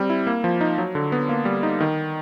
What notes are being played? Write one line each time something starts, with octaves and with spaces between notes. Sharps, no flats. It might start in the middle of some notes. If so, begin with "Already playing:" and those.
Already playing: G3 C4
E4
A#3
F3
D#4
F#3
D3
B3
A#3
G3
D#4
D#3